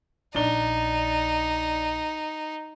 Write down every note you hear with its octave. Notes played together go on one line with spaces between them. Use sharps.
A#1 D4 D#4 G7